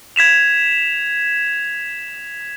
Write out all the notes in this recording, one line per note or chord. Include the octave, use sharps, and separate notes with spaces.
G#6 B6 E7 F7